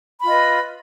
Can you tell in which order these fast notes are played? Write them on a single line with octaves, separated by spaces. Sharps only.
B5 F4 D#5 B4